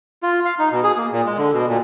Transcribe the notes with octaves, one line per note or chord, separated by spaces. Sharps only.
F4
F5
D#4
B2
G#4
A#3
A#2
G#3
D3
B2
A#2